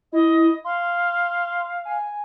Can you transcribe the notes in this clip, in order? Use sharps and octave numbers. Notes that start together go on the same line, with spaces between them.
E4 D#5
F5 C6
G#5